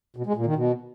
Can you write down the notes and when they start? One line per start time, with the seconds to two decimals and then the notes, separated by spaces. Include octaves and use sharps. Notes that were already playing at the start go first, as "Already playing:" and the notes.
0.17 B2
0.26 G#3
0.36 A#2
0.46 D#3
0.56 B2